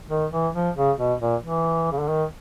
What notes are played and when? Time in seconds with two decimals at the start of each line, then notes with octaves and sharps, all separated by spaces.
0.10 D#3
0.33 E3
0.55 F3
0.76 C#3
0.99 B2
1.21 A#2
1.43 E3
1.92 C#3
2.00 D3
2.09 D#3